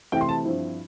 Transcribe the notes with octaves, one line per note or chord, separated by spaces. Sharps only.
C3 E3 A3 E4 G5
C6
A5
G2 F3 C4 E4